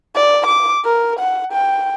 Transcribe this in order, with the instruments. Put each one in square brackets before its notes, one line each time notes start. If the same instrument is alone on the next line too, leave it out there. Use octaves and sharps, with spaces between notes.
[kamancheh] D5
D6
A#4
F#5
G5